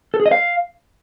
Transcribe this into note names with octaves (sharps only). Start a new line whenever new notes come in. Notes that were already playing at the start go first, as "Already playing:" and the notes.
A4
G#4
D#5
F5